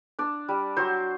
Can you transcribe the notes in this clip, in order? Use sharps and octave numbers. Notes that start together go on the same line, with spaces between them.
D4 D5
G3
F#3 C5